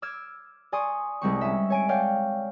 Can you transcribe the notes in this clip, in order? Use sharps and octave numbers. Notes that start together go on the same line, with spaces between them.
D6 E6 F6 G#6 E7
D5 G#5 C6 C#6 D#6
C2 G#3 C4 C#6
C#4 E5
C#5 G#5 D7
C#5 D5 F5 G5